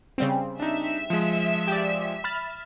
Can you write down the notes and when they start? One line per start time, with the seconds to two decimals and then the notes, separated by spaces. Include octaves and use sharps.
0.18 C#3 G3 C4
0.60 D4 D#4 E5
1.10 F3 G#3
1.68 G4 D5
2.24 B5 F6 A6